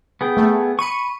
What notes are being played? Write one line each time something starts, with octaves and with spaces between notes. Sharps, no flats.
B3 G#4 G5
A3
B5 C#6 C#7 D#7